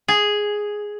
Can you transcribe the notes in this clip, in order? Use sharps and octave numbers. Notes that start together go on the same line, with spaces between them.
G#4